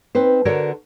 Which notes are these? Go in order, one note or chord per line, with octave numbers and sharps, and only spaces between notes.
C4 D#4 B4 C5
D3 F#4 A4 A#4 C#5 D5